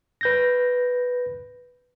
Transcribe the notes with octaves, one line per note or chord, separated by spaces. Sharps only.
B4 G6 A#6